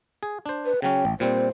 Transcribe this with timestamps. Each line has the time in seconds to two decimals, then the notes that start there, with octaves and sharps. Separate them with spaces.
0.23 G#4
0.46 D4 C5
0.65 B4
0.82 C#3 F#3 C#4 G5
1.05 A1
1.20 A#2 G3 C4 C5